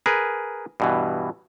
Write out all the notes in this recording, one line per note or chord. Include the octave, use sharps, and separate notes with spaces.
G#4 A#4 B4
G2 B2 E3